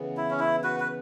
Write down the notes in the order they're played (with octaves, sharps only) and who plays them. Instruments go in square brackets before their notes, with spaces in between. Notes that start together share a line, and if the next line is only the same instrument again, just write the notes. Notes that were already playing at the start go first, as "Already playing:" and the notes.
Already playing: [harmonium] C#3 E3 B3
[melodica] E4
C#4
E4
F#4 B4
B4